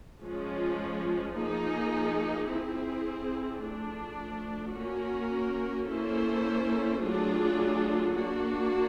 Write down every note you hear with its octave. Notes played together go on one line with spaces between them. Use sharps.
F3 G#3 C#4
F3 A#3 D#4 G#4
C4 E4 G#4
F3 A3 D4
A#3 C#4 F#4 A#4
A#3 C#4 E4 A4 C5
F#3 A3 D4 F4 G#4
A#3 D4 F#4